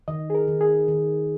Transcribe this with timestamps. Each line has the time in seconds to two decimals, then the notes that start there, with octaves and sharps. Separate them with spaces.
0.08 D#3 D#5
0.30 G#4
0.35 A#4
0.48 D#3
0.61 G#4
0.88 D#3